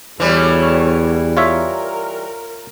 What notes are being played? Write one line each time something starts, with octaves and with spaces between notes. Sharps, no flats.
E2 E3 G3 F#4 A4 C#5
F4 A#4 C#5 E5